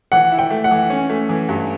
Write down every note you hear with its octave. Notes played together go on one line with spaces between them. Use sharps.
E3 F#5
E4
G5
A3
F#5
E3
C#4
A3
E3
G2